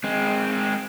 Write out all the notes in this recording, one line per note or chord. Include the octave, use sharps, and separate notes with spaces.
G#3 C4